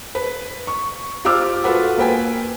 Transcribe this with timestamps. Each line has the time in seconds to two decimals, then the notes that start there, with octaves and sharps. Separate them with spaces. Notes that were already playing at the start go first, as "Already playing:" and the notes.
0.15 B4
0.67 C#6
1.25 F4 G4 C5 D6 E6 F6
1.64 F4 F#4 A4 B4 F#5
1.98 A#3 B4 G5 G#5